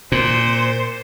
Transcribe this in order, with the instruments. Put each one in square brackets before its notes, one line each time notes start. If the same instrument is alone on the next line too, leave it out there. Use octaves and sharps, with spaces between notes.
[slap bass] A#2 [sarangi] C5